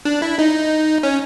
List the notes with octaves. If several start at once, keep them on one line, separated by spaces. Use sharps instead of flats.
D4
E4
D#4
C#4